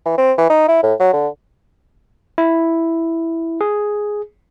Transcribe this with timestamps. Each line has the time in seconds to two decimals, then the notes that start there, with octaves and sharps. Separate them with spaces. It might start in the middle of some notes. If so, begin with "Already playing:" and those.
0.06 E3
0.18 C4
0.38 E3
0.50 D#4
0.68 E4
0.83 A2
1.00 F#3
1.13 D3
2.38 E4
3.61 G#4